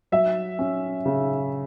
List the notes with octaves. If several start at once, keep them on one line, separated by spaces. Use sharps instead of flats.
F#3 E5
C#4
C#3